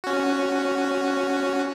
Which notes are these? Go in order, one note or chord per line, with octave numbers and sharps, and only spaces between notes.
C#4 F#4